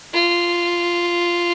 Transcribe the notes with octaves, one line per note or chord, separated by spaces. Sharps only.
F4